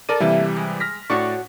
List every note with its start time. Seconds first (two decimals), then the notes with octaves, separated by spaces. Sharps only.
0.09 A4 A#4 D5 D#7
0.20 C3 E3 G3 A3 A#3 E5
0.56 G#3
0.80 F6 A#6 B6
1.10 A2 D4 F#4 C#5 D5 C#6